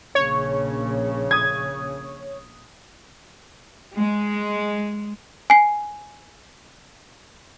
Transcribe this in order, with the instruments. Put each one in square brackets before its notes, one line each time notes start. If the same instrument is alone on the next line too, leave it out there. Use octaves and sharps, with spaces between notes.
[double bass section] A#1 C#3 [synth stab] C#5
[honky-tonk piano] D#6 G#6
[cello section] G#3
[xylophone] G#5 C7